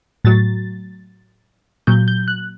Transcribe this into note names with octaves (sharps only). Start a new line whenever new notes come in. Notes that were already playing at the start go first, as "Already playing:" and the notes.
A2 F#3 A6
A#2 F#3 G6
G6
F#6